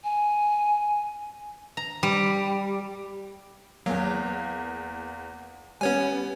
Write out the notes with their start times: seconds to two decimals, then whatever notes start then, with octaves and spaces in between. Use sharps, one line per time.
0.04 G#5
1.77 A#5
2.03 G3
3.86 E2 F#3 A#3
5.81 G3 B3 C#4 C#5 G#5